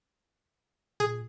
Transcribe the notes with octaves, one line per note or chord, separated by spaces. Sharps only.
A#2 G#4